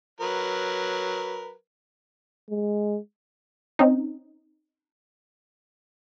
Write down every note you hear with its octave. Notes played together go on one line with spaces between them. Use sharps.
F#3 A#4 B4
G#3
C4 C#4 D#4